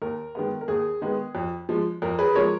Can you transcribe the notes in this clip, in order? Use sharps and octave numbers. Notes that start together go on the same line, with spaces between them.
D#2 A#4
D#3 G#3 B3
A#4
D#2 G#4
D#3 G#3 B3
F2
F3 G#3
F2 A#4
G#4 B4
F3 G#3 A#4 C#5